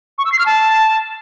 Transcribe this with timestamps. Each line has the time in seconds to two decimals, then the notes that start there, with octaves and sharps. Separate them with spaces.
0.18 C#6
0.25 E6
0.32 C7
0.39 F6
0.46 A5